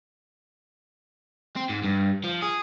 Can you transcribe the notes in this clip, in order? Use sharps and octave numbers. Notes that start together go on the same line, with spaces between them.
C4
G#2
G2
F3
G#4